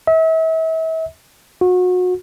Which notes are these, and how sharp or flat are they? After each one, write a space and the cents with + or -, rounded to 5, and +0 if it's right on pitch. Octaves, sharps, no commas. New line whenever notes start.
E5 -40
F#4 -30